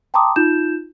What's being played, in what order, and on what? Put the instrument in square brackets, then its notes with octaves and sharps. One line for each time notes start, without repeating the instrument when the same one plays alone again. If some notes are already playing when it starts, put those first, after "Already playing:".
[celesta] G5 A5 A#5 C6 D6 D#6
D#4 F4 G6 E7